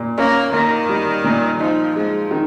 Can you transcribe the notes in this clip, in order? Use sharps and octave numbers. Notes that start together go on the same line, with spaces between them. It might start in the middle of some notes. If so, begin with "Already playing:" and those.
Already playing: A#2
A#3 C#4
D#3 A#3
G3
A#2
F3 D#4
F3 G#3
D#3